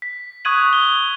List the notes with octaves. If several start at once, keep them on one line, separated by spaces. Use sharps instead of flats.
B6
C#6 D#6 F#6 G#6 D#7 F#7
G7